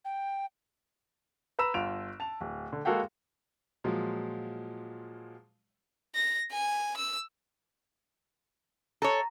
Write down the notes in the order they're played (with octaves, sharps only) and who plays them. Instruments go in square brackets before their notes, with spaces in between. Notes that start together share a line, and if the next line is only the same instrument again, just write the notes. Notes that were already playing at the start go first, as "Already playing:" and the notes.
[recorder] G5
[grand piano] B4 A#5 B5 E6 E7
G1 F4 D7 F7
A5 F7
D1
D3
G#3 A#3 F#4 A4 F5 G5
A#2 F3 F#3 G#3
[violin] A#6
G#5
E6
[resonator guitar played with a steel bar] A4 C#5 [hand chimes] A#5